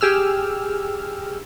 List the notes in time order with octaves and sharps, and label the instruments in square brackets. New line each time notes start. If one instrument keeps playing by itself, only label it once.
[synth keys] G4 G#4 E6 F6